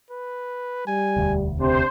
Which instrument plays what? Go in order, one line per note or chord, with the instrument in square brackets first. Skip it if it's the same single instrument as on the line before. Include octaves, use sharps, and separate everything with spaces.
[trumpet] B4
[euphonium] G3 [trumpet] G#5
[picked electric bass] E1 D2
[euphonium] C3 [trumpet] D4 [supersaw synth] C5